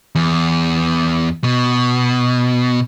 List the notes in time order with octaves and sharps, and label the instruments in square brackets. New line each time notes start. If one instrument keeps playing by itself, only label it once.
[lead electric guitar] E2
B2